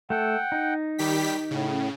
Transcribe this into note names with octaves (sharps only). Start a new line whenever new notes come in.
A3 A4 F#5 G5
D#4
D#3 G3 G4 B6
A2 C#3